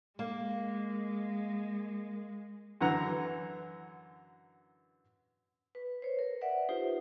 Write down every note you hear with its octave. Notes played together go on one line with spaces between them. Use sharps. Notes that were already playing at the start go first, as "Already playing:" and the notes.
G#3 A#3
F#2 D3 E3 F#5 A#5
B4
C5 C#5
A#4
B4 D5 E5 F#5
D#4 F4 G4 C5